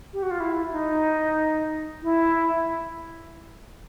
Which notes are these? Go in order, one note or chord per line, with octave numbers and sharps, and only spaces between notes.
G4
F#4
F4
E4
D#4
E4